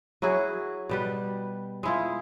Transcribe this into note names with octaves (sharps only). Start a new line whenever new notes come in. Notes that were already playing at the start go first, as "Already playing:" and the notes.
F#3 E4 F#4 G#4
B2 G3 B4
G#3 E4 F4